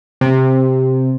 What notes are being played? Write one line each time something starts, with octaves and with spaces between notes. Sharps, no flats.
C3